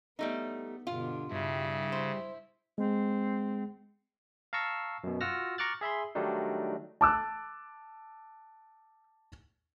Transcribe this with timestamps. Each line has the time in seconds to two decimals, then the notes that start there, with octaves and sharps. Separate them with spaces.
0.19 G3 A3 B3 D#4
0.87 G2 B2 D3 F4
1.31 G2 C#3 E4
1.92 C5
2.78 G#3 C4
4.53 F5 A5 A#5 C#6 E6
5.04 F#2 B2
5.21 F4 F#4 F#5 E6 F6 A#6
5.58 A#5 C#6 D6 F6 F#6 A6
5.81 G#4 E5 B5 C6
6.15 D#3 F#3 G3 A3 D4 D#4
7.01 A5 D6 E6 F#6